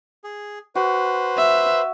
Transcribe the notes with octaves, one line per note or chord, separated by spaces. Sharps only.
G#4
F#4 B4 C5
E5